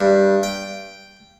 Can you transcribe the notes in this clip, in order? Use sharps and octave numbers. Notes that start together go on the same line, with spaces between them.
G2
G5